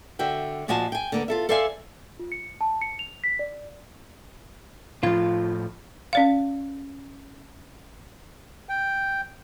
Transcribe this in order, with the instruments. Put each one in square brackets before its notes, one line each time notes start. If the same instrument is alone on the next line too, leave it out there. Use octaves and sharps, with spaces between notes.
[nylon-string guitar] D3 F#4 E5 G5
A#2 F3 F#4 D#5 G#5 A5
G5 G#5
D3 A#3 B3
F4 A4 E5
A4 C5 D5 E5 F5 G#5
[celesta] F4
C#7
A5
C#7
F7
B6
D5
[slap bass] A2 F3 [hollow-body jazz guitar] F4
[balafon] C#4 D5 F5
[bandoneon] G5